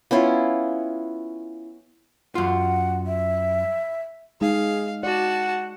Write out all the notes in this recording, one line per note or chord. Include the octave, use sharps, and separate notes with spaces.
B3 C#4 E4 F4
F#2 F4 F#5
E5
G#3 D#4 G#4 F5
F#4 D5 F#5 A5